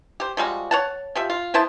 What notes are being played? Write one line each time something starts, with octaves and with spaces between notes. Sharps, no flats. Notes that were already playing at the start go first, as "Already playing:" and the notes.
G4 C5
F3 G3 G#3 F#4
C#5 F#5 A5
F3 G4 E5
F4
B3 E4 C5 A5